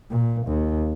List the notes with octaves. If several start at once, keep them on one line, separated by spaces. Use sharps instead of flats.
A#2
D#2